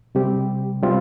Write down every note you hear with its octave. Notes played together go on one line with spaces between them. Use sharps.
C3 G3 C4 G4
C3 G3 C4 F4